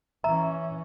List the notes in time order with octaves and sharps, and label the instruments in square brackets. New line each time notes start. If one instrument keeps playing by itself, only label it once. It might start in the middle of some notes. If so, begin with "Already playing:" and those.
[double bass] E3 C#4 [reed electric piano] E5 [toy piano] A#5